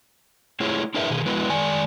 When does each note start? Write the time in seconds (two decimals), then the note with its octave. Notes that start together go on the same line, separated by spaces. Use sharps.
0.60 A3 E4 F4 G#4 C#5
0.94 D4 E4 G#4 A#4 B4 E5
1.10 B2 D#3 G#4
1.25 F3 G#3 B3 E4 F#4 B4
1.50 D#3 G#3 D5 G#5